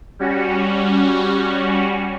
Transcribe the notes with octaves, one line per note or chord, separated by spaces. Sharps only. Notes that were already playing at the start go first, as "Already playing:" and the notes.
G3 C#4 F#4